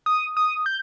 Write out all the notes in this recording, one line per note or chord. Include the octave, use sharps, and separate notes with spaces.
D#6
D#6
G6